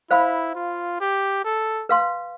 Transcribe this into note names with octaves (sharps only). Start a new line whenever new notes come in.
E4 C5 F5 B5
F4
G4
A4
B4 F5 C6